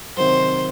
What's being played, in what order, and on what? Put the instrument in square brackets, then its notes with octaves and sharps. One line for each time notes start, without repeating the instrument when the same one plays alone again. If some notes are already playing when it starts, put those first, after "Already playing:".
[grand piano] C3 D#3 F#3 [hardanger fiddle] C5